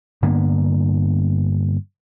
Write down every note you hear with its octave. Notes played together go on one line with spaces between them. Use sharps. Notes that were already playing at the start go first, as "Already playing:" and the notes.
G2 D3 A#3 B3